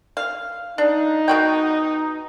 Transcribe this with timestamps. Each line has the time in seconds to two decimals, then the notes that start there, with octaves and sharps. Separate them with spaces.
0.17 F5
0.78 D4 D#4
1.28 B2 F#4 G5